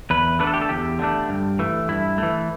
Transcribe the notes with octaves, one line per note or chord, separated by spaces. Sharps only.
E2 B4
D3 A3 D4 B4
A4
G4
A4
E2 G4
D3 A3 D4
G2
E3 A3
G2 E4
E3 A3